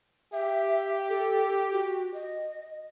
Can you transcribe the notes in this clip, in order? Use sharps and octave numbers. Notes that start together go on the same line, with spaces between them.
G4 E5
A4
F#4
D#5